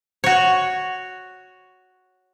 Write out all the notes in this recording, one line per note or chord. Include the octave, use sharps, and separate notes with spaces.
F#4 C#5